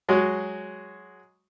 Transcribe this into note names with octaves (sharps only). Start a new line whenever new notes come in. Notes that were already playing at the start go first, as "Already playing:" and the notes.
F#3 G#3 F#4